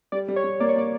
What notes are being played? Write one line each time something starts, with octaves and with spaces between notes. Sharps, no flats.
G3 D5
G3
C#5
G3
A#3 D5
C#5
A#3 D5